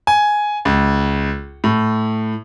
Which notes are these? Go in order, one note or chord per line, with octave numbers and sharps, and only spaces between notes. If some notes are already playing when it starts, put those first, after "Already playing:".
G#5
C#2
A2